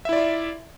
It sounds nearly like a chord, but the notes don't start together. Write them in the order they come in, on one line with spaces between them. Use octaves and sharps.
E5 E4 D5 F4